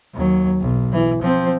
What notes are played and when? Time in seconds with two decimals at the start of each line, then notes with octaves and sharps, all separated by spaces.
0.14 D#2 F#3
0.61 B1
0.93 E3
1.22 F3 C4